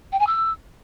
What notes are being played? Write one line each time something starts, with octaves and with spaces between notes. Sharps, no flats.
G5
G#5
E6